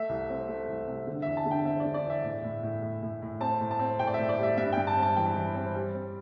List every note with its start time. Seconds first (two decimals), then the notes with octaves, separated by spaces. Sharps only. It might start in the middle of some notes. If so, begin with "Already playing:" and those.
Already playing: A3 E5
0.09 C2
0.29 C4
0.48 A3
0.68 C2
0.88 C3
1.07 D3
1.22 E5
1.27 E2
1.37 A5
1.46 D3
1.51 G5
1.65 C4 E5
1.80 D5
1.85 D3
1.94 D5
2.05 E2
2.10 E5
2.24 A2
2.44 A2
2.63 A2
2.82 A2
3.02 A2
3.22 A2
3.40 C4 A5
3.61 A2
3.71 A5
3.79 C4
3.99 A2 G5
4.07 D5
4.14 E5
4.19 A2
4.29 D5
4.39 G3 E5
4.57 G2 E5
4.72 G5
4.77 G2
4.87 A5
4.97 C4
5.02 A5
5.16 E3 G5
5.35 E3
5.55 C4
5.75 G3
5.95 C4